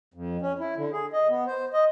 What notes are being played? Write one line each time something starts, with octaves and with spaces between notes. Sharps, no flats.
F2
C#4
E4
D3
G#4
D#5
B3
C5
D#5